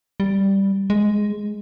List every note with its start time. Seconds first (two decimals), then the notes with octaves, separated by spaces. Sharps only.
0.20 G3
0.90 G#3